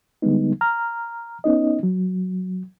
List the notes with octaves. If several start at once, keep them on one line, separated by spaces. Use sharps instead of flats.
D3 G3 G#3 B3 D#4
A#5 F6
B3 C#4 D#4 D#5
F#3